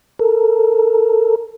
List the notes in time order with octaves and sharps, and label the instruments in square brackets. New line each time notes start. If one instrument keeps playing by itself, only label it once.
[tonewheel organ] A4 A#4